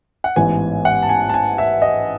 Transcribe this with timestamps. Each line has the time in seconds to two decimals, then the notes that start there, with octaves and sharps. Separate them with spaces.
0.24 F#5
0.36 A1 G#2 E3 B3 G#5
0.85 F#5
1.03 A5
1.09 G#5
1.29 A5
1.34 G#5
1.58 E5
1.82 D#5